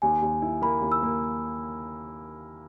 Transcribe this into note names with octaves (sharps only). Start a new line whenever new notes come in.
D#2 G#5
D#2
E4
A#3 B5
D#2
E6
A#3